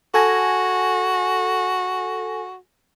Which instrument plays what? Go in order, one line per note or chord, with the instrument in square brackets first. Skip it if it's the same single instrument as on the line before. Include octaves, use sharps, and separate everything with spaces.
[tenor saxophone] F#4 [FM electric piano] A4 G#5 A#6